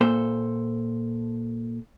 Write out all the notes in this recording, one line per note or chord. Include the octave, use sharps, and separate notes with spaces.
A#2 A4 C5